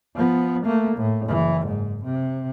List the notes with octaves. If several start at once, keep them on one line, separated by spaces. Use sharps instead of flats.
F3 B3
A3 A#3
A2
F#1 E3
G#2
C3